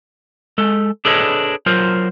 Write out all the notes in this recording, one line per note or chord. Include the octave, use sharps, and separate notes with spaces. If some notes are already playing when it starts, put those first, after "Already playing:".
G#3 A4
D4 G#4 A4 B4 C#5 D#5
F#3 F4 A#4 C5